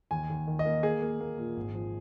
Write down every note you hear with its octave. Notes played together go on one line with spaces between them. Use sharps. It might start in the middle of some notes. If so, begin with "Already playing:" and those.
D#2 G#5
D#2
D#3
D#5
A#3
A#3 G#4
A#3
A#3
A#2
G#1
F3